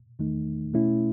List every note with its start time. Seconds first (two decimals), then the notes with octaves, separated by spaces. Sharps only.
0.19 E2 D#3 A3 D#4
0.74 B2 A3 C#4 E4